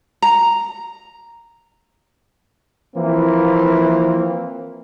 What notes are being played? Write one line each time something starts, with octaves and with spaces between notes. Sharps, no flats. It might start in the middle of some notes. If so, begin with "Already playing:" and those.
A#5
E3 F3 A#3 C4